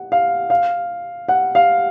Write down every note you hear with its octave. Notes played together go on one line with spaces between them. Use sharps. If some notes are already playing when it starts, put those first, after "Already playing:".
Already playing: F#5
F5
F5
F#5
F5